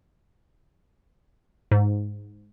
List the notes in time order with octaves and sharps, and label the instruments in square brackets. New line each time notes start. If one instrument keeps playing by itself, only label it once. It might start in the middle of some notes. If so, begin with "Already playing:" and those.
[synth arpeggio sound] G#2